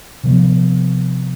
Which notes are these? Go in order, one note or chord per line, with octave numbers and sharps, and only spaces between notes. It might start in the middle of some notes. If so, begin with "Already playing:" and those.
C3 F3 B3